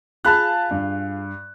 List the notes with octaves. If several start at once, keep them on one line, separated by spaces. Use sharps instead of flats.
F4 G#4 F5 A5 B5 F#6
G2